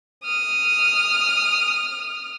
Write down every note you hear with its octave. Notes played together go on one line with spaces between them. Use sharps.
D#6 F6